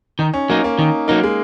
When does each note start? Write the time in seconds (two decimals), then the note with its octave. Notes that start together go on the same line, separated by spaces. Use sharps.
0.19 D#3 D#4
0.34 C#4
0.49 F#3 A#3 D#4
0.64 A#3
0.78 D#3 D#4
1.08 F#3 A#3 D#4
1.24 G#3